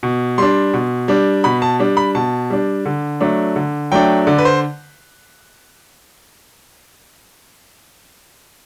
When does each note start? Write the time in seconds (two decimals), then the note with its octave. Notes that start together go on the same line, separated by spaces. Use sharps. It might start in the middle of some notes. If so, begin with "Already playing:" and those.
0.03 B2
0.38 G3 D4 C6
0.74 B2
1.08 G3 D4
1.44 B2 B5
1.62 A5
1.80 G3 D4
1.97 B5
2.15 B2 A5
2.50 G3 D4
2.86 D3
3.21 F#3 A3 D4
3.56 D3
3.92 F#3 A3 D4 G5
4.27 D3 D5
4.38 B4
4.45 C5